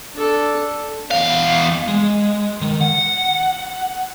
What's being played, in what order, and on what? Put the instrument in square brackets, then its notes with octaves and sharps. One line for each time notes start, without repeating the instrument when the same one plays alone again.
[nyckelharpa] D4 A4
[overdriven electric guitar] E2 F5
[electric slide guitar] G#3
D#3
F#5